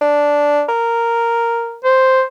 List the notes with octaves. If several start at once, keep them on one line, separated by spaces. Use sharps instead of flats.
D4
A#4
C5